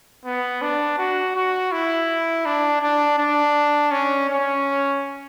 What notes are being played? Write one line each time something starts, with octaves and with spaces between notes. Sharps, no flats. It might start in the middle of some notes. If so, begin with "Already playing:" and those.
B3
D4
F#4
F#4
E4
D4
D4
D4
C#4
C#4